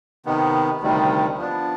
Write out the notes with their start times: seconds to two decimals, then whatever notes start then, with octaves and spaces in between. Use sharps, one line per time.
0.25 C3 D#3 B3
0.81 D2 C3 D#3 G3
1.38 F3 B3 D4